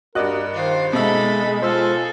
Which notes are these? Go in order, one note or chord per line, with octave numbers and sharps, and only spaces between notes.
G2 F#4 A#4 D5 D#5 F#6
D#3 F4 C5
B2 G#3 D#4 A4 E5 B5
F4 G#4 A4 C5 E6